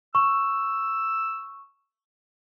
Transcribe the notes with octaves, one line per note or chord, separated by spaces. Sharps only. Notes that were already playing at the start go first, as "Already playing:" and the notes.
C#6 E6